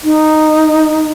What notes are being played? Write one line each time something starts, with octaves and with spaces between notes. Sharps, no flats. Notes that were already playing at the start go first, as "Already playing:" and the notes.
D#4